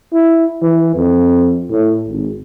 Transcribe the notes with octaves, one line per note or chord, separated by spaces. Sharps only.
E4
E3
F2
A2
G#1